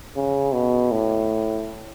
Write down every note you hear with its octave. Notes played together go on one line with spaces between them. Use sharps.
C#3
B2
A2